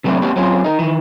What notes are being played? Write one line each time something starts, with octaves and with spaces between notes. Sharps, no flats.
C3 F#3 A3 A#3 C4 D4
A#3 C4 D4 F#4 G4
F#3 C4 C#4 F4 G#4
D#4 A#4
D#3 E3